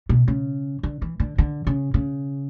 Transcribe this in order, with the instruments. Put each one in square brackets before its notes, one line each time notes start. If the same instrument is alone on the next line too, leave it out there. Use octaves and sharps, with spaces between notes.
[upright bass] B2
C#3
D3
E3
D3
D3
C#3
C#3